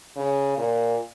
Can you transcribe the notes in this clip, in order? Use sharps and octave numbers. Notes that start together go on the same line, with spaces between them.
C#3
A#2